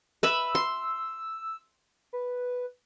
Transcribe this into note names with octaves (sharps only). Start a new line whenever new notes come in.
B4 E5 B5 E6
C6
B4